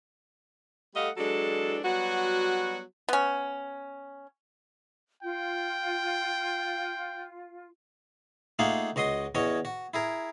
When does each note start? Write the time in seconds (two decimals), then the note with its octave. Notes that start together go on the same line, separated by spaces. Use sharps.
0.95 G3 A3 A4 D#5 F5 F#5
1.17 E3 F#3 G#3 D4 A4
1.84 F#3 G3 B3 F#4
3.09 B3 C#4
5.23 F4 G5
8.59 A3 A#3 D#4 F4 G#4 F#5
8.96 C#2 F#4 D#5 C6 D#6
9.35 E2 C#4 F#4 C#5 D#5
9.65 F#4
9.94 E4 G#4 A#4